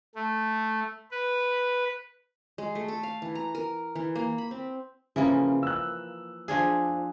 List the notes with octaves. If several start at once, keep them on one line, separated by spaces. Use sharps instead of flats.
A3
B4
G#3
A3
A4
F5
E3
A#5
A#4
E3
A#3
B5
C4
C#3 E3 F3 A#3
E6 F#6
F3 D4 G#4